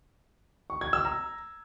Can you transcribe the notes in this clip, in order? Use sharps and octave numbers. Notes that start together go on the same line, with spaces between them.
C#6
G#6
E6
A#5